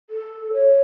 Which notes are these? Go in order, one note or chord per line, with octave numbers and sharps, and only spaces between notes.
A4
C#5